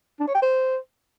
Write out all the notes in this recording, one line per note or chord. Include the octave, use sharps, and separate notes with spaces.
D4
C#5
G5
C5